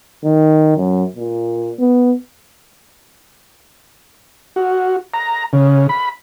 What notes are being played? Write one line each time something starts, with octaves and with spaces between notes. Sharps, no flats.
D#3
F#2
A#2
B3
F#4
A#5
C#3
B5